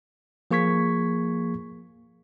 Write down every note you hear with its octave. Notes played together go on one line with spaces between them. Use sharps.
F3 A#3 G#4 C#6 G#6 B6